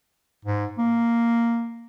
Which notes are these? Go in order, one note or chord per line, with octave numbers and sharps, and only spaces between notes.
G#2
A#3